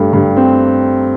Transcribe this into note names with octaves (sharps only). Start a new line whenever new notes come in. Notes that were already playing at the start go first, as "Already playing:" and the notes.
Already playing: G2 A3
G2
C4